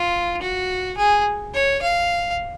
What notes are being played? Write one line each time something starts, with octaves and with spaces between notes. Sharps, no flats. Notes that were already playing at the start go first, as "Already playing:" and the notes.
Already playing: F4
F#4
G#4
C#5
F5